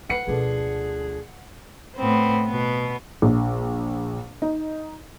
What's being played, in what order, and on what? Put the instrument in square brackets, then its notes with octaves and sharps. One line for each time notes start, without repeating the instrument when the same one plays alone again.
[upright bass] A3 E4 [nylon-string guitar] C4 B4 [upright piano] F#5 C7 C#7
[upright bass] D2 B2 [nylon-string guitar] F3 D4 A4 [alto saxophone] G#4
[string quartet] A2 B3 C4
B2 B3
[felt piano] A#1
D#4